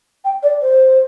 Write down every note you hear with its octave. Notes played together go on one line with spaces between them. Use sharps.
G5
D5
C5